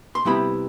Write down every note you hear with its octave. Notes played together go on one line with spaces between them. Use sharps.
C6
C3 G3 B3 E4 B5